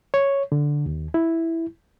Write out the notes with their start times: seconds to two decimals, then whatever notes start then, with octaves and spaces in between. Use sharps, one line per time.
0.14 C#5
0.52 D3
0.86 D#2
1.14 E4